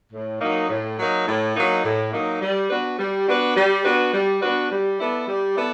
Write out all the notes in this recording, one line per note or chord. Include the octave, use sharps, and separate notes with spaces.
A2
F#3 A#3 D#4
A2
F#3 A#3 D#4
A2
F#3 A#3 D#4
A2
F#3 A#3 D#4
G3
B3 D4 F#4 B4
G3
B3 D4 F#4 B4
G3
B3 D4 F#4 B4
G3
B3 D4 F#4 B4
G3
B3 E4 A4 D5
G3
B3 E4 A4 D5